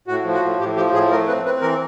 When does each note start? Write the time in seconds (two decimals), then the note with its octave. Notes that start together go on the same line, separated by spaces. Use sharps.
0.08 A2 F#4
0.25 F3
0.34 F#4
0.42 A2
0.59 A2 G4
0.76 F3 G4
0.93 A2 G#4
1.10 A3 A#4
1.27 C4 B4
1.45 C4 B4
1.62 E3 A#4